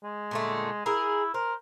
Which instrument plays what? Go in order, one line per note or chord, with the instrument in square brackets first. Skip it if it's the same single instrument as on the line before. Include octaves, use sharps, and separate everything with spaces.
[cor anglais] G#3
[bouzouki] A#2 D3 A3
[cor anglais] E4 [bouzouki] G#4 A#4
[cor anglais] A#4 [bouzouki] C5